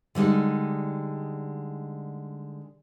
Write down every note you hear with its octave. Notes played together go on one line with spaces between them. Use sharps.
D3 G3 G#3 D#4